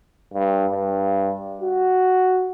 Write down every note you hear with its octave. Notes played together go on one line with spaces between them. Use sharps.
G2
G2
F#4